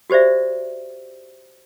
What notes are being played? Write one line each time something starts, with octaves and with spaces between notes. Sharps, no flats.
F#4 G4 C5 D5 E5